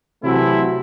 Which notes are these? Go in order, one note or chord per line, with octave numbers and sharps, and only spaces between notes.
C3 E3 F#3 A3 C4 E4